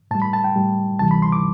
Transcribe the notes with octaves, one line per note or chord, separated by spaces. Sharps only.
A2 G3 A5
B5
A5
G5
A2 G3
D2 C3 E3 G3 A5
B5
C6
D6